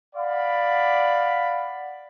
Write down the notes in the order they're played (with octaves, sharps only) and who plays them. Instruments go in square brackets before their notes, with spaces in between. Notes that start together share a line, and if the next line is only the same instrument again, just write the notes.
[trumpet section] D5 F5 F#5 B5